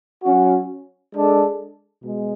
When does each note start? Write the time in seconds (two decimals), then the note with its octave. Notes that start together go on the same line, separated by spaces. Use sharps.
0.24 F#3 C#4 F#4
1.14 G#3 D4 A4
2.03 B2 G#3